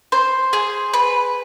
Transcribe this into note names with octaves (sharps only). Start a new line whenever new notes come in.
C5
G#4
B4